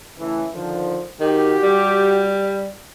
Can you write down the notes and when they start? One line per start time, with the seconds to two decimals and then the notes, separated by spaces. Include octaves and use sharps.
0.17 A2 C#3 E3
0.52 D3 D#3 F3
1.21 D#3 F#4 G4
1.63 G3